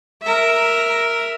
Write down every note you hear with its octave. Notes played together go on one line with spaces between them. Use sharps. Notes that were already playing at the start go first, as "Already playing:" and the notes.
A#4 E5